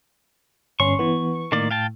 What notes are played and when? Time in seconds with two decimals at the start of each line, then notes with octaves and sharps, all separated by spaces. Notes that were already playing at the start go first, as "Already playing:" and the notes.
0.80 G1 C#4 C6 C#6
0.99 E3 B3
1.52 A2 D#3 A#3 D5
1.71 F5 G5 A5